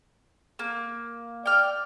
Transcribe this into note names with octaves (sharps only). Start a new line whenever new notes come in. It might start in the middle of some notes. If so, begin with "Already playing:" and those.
A#3
D5 G5 F6